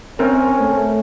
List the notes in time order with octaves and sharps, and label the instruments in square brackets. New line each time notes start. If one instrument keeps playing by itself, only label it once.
[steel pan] C4 A#4 [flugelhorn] C#4
[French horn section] A3